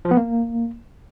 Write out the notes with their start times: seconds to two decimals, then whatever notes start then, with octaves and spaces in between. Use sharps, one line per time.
0.05 F3
0.11 B3
0.17 A#3